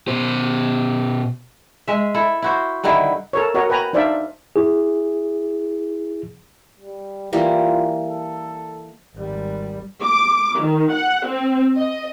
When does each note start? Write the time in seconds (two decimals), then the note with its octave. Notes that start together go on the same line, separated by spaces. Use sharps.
0.08 B2 C5
1.88 G#3 E5
2.14 E4 A4
2.42 E4 F#4 C5
2.84 G2 D3 D#3 E4
3.33 A4 A#4 C#5
3.54 F#4 A#4 C#5 D#5
3.70 B4 G5 G#5 A#5
3.93 D4 D#4 C5 D5 E5 F5
4.56 E4 G#4
6.80 G3
7.33 E3 G3 A#3 F4
8.09 A4
9.15 G#1 G3
10.02 D6
10.59 D#3
10.92 F#5
11.27 C4
11.75 D#5